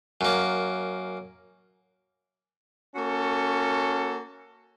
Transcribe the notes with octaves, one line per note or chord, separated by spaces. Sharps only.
F#2 A#3
A#3 C#4 F#4 A4